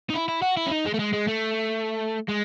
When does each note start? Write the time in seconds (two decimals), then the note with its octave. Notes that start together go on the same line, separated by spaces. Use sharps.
0.10 D#4
0.14 E4
0.28 E4
0.42 F#4
0.57 E4
0.67 C#4
0.71 D#4
0.86 G#3
0.94 A3
1.00 G#3
1.14 G#3
1.28 A3
2.28 G#3